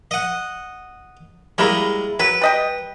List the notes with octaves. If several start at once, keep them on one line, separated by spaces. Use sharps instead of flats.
D#5 F#5
G3 G#3 A#3 E4 A#4
F#3 B4
G3 D#5 G5